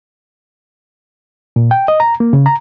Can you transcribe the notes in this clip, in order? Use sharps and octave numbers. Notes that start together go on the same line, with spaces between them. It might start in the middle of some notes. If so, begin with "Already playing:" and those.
A#2
G5
D#5
A#5
A#3
C#3
A#5